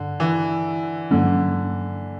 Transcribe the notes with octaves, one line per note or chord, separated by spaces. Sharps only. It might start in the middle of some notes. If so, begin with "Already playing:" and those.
Already playing: G2 D3
E3
G2 D3 F#3 A#3 C#4